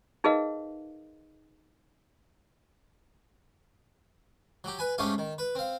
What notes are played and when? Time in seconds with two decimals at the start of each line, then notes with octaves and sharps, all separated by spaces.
0.24 D#4 G#4 A#4 B4 D#5 F5
4.64 F#3 G4
4.79 B4 G#5
4.98 G#2 A3 C#4 G4 F5 G#5
5.18 D#3
5.38 B4
5.55 C4 F5